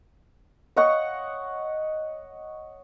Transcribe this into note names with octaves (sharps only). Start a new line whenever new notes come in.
C#5 D#5 F#5 C#6